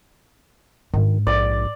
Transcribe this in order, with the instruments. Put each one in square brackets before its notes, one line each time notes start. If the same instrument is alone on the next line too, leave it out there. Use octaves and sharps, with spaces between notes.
[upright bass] G#2 D4 [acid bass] D#3
[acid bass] A#1 [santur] D5